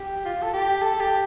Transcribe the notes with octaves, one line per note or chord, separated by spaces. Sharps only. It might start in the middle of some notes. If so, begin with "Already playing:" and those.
Already playing: G4
F4
A4
G4
A4
G4